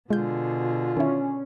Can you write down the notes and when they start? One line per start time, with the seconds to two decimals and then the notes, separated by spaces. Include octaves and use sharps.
0.10 B2 D3 G#3 F4 G#4 G6
0.97 D#3 C#4 E4